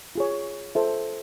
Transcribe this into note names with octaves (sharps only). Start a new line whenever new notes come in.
F4 G#4 C#5
F4 A4 C5 E5